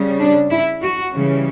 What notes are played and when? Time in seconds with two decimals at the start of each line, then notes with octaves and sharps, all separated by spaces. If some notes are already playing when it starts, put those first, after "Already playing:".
Already playing: C#3 G3
0.19 D4
0.50 E4
0.82 F#4
1.13 C#3 E3 G3